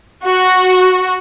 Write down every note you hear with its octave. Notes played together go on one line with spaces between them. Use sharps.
F#4